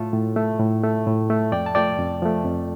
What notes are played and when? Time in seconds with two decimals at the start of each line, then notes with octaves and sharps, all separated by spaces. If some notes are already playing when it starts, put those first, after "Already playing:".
Already playing: A2 A3 F4 A4
0.13 A2
0.36 A3
0.60 A2
0.83 A3
1.06 A2
1.30 A3
1.52 F2 D5 G5
1.66 A5
1.75 F3 A3 D5 G5
1.98 F2
2.22 F3 A3
2.44 F2